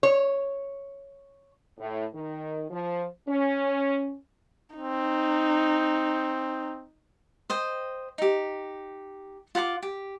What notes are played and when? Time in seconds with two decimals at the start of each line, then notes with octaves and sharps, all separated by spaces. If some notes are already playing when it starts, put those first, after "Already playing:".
0.03 C#5
1.78 A2
2.14 D#3
2.70 F3
3.28 C#4
4.76 C4 D#4
7.50 C5 D#5 G5
8.18 D#4 G4
9.55 F4 F#5 A#5 D6
9.82 G4